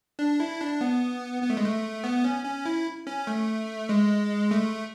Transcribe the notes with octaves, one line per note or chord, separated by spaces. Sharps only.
D4
E4
D4
B3
B3
A3
G#3
A3
B3
C#4
C#4
E4
C#4
A3
G#3
A3